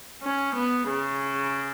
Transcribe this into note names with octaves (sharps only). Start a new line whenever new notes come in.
C#4
B3
C#3